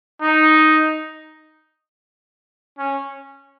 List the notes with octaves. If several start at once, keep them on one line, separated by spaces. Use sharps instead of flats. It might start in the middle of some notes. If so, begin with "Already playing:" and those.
D#4
C#4